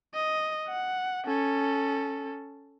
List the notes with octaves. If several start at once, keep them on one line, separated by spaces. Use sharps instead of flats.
D#5
F#5
C#4 A4